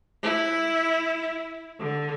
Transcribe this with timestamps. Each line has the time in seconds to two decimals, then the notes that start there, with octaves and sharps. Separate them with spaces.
0.23 E4
1.80 D3